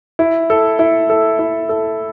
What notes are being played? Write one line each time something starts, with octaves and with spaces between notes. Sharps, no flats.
E4
A4
E4
A4
E4
A4